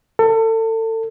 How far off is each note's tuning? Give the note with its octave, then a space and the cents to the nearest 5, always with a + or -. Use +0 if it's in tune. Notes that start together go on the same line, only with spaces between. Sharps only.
A4 +30